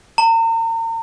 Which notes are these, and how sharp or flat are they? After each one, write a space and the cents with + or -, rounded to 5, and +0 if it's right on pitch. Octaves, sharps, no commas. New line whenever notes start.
A#5 -40